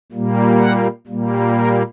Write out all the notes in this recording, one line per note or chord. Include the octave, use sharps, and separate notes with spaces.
A#2 G3 A#3
F#5
A#2 G3 A#3
A#4